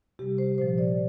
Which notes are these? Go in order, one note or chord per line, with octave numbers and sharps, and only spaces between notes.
C3 G3 G4
C5
A#2 F3 C5
D5